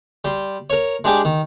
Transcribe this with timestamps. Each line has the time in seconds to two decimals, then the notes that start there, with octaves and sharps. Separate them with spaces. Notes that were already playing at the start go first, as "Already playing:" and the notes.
0.25 G3 C6
0.70 A#4 C#5
1.04 G#3 D4 G4 G#4 D5
1.25 D#3